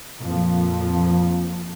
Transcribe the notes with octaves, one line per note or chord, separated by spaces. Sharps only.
F2 A#2 F3